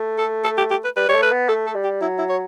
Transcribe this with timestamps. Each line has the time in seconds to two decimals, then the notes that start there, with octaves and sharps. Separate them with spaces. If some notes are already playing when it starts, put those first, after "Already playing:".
Already playing: A3
0.18 A4
0.44 A4
0.58 G4
0.70 G4
0.84 B4
0.96 G3 B4
1.08 G3 C#5
1.14 A3
1.22 B4
1.32 B3
1.48 A3 A4
1.66 A4
1.75 G3
1.84 G4
2.01 F#3 E4
2.18 E4
2.29 C#5